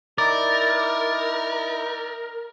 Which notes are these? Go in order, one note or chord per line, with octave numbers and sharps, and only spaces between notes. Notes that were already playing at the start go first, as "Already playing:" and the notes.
D#4 E4 A#4 D5